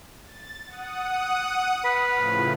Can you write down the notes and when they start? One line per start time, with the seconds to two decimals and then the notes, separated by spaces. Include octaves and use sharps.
0.24 A6
0.67 F#5 D#6
1.84 B4 B5 F6
2.15 A2 C#3 F3